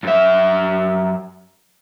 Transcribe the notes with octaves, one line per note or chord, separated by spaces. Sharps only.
F#2 E5